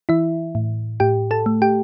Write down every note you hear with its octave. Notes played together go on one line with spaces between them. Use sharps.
E3 E4 E5
A2
A2 G4 G5
A4 A5
A3
G4 G5